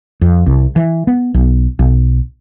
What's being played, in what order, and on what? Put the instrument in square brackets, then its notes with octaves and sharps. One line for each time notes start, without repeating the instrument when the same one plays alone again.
[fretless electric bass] F2
C2
E3
B3
B1
B1